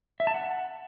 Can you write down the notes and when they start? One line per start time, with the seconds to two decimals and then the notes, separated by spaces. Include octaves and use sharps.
0.20 E5
0.27 A5
0.34 F#5